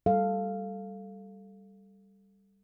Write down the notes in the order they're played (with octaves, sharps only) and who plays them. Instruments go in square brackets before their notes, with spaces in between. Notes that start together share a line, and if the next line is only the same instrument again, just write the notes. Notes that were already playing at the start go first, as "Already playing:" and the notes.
[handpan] G3 A4 F5